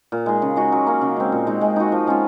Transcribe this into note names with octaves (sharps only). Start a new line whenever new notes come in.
A#2
G#3 D#4 G#4
C#3
G#3 D#4 F#4
F#3
A#3 C#4
C#3
G#3 C4
A#2
G#3 D#4
G#3
D#4 F#4
F3
G#3 C#4 F4